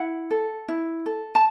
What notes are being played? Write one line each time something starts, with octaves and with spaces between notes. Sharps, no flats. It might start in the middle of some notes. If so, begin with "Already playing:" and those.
Already playing: E4 F#5
A4
E4
A4
A5